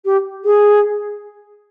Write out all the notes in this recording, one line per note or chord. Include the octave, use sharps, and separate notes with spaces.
G4
G#4